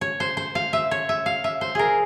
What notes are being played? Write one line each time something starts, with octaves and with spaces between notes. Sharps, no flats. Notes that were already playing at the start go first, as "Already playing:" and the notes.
C#5
C5
C5
F5
E5
C#5
E5
F5
E5
C5
G#4 A#4